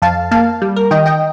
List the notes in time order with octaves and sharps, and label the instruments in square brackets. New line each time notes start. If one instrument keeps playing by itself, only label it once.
[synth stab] F2 F5 A5
A#3 F5 A5
G3
A#4
D#3 D#5 G5
D#5 G5